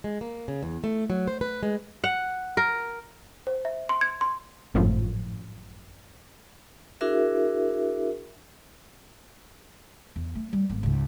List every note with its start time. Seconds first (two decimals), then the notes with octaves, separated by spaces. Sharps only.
0.04 G#3
0.21 A#3
0.48 C#3
0.63 E2
0.84 A3
1.10 F#3
1.28 C5
1.41 B4
1.63 G#3
2.04 F#5
2.57 A#4
3.47 C5
3.65 E5
3.89 C6
4.01 G#6
4.21 C6
4.74 G#1 F#2 A2 F3
7.01 D4 E4 F#4 G#4 A#4 E5
10.16 E2
10.35 A3
10.53 G3
10.70 G#1 B3
10.83 C#2 G#2